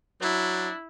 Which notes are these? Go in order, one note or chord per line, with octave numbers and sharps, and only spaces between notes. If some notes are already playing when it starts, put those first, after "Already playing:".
F#3 D4 E4